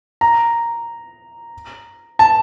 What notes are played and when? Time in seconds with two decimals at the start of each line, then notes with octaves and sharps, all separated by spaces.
0.21 A#5
2.19 A5